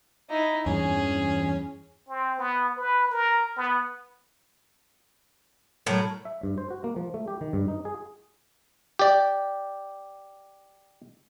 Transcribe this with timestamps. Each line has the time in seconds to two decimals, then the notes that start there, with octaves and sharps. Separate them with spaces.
0.30 D#4 E4
0.66 E2 G2 E3 C#4 G#4
2.09 C4
2.39 B3
2.77 B4
3.11 A#4
3.57 B3
5.86 A2 F#3 A#4 C#5
6.25 E5
6.43 G2
6.58 C5
6.71 F#4
6.84 A#3
6.96 F3
7.14 A3
7.28 G4
7.41 D#3
7.53 G2
7.68 D#4
7.85 G#4
8.99 G4 D5